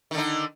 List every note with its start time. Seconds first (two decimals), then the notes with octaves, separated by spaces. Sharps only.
0.11 D#3
0.15 D3
0.18 D#4